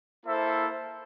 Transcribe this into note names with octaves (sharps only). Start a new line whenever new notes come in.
A#3 E4 A4 C5 E5